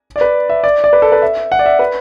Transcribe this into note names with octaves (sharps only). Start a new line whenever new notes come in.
D5
B4
E5
D5
D5
B4
A4
B4
E5
F#5
D5
E5
B4